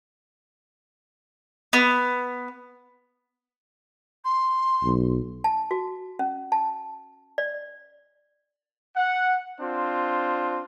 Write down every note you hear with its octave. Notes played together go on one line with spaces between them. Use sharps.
B3
C6
B1
A5
F#4
C#4
A5
D5
F#5
C4 D4 F4